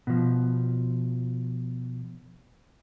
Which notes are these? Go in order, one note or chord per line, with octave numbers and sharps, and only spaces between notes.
B2 F3